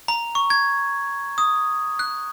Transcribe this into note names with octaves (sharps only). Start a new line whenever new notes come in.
A#5
C#6
G#6
D#6
F#6